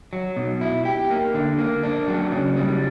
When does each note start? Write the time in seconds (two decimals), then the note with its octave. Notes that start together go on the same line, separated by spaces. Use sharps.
0.13 F#3
0.37 B2
0.61 E4
0.85 G4
1.10 A#3
1.34 D3
1.59 A#3
1.83 D4
2.08 F#3
2.32 C#3
2.57 G3